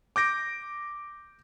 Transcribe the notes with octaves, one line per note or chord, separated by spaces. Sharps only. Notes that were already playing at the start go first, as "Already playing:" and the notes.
D6 G6 A#6 D7